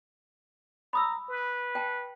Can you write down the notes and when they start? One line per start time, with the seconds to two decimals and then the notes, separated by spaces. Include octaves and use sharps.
0.93 A#5 B5 D#6 E6
1.29 B4
1.75 G5 A5